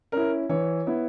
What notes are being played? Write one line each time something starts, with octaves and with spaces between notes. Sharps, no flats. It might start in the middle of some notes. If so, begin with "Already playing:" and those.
C#4 E4 A#4
E3 C#5
B3 E4